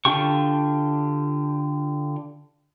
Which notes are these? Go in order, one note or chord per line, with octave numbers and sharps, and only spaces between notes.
D3 D4 F4 G4 C#6